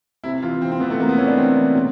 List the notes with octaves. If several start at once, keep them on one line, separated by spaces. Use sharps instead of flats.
C3 E4
E3 F4
C3 C4
C4
E3 B3
A3
C3 A#3
B3
E3 C#4
D4
C3 C4
E3
B2